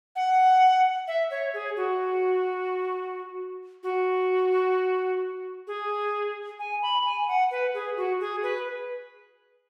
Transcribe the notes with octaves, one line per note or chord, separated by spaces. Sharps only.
F#5
E5
C#5
G#4
F#4
F#4
G#4
G#5
B5
G#5
G#5
F#5
B4
G#4
F#4
G#4
B4